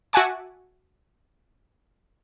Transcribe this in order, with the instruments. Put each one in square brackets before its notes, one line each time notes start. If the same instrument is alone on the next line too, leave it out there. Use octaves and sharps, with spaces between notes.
[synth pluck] F#4 E5 F#5 G#5 A5 D6